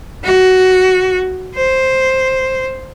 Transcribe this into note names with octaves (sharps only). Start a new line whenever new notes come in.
F#4
C5